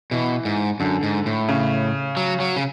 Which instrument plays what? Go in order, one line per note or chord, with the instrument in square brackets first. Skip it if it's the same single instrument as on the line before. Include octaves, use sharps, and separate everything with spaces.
[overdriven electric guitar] B2 [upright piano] E3
[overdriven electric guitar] G#2
[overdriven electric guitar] F#2 [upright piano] D3
[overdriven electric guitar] G#2
A2
[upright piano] C#3
[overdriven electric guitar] F#3
F#3
C#3